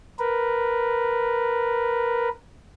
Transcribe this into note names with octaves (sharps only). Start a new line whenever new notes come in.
A#4 B4